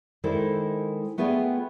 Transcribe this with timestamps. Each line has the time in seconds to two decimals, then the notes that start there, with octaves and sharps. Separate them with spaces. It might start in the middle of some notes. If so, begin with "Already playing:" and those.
0.24 D#3 G#3 E4 A4 C5 D5
1.18 A3 B3 F4 G#4 D5 G5